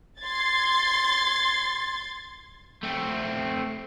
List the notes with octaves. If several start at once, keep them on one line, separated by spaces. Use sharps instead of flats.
C6 G#6 A6
A3 C4